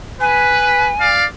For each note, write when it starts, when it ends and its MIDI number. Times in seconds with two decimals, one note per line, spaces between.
0.21 0.89 71
0.21 1.10 80
0.99 1.24 74
0.99 1.24 77